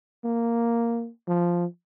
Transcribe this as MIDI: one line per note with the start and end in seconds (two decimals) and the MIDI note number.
0.25 1.09 58
1.28 1.66 53